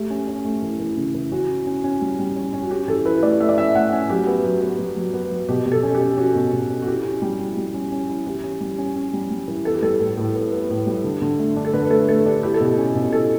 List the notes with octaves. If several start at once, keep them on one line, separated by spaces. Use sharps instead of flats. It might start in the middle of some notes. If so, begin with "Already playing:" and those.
Already playing: A3 G4
C#4
C#4
A3
E3
E3
C#3
E3
C#4 F#4
E4
C#4
C#4
G3
G3
C#4
C#4
F#4
C#4 G4
E3 A4
E4 B4
A3 D5
A3 E5
D5
C#4 E5
A3 F#5
C#4
F#3 G4
B3
F#3
B3
F#3
F#3
B3
F#3
B2 G4
B2
A4
C#4
G4
C#4
C#4 F#4
B2
B2
C#4
F#4
E4 G4
C#4
G3 G4
E4
G3
C#4
C#4
E4
E3 G4
C#4
G3
C#4
C#4
G3
G3
E3
B3 A4
G4
G3 A4
A2
A2
B3
B3
A2
G3
D3
D3
A3
D4
A4
D3 B4
B4
A3 A4
A3 A4
D4 G4
E4 G4
A4
B2 G4
C#4
B2
E4 A4